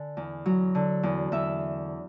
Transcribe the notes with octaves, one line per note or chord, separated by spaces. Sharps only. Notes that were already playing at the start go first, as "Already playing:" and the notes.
Already playing: D3 G#5
E2
F#3
D3
E2
E2 E5